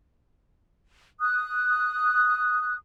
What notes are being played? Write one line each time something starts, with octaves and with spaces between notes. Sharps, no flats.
D#6 F#6